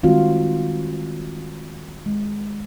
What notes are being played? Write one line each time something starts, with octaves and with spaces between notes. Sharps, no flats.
D#3 G3 G#3 C4 F4 F#4
G#3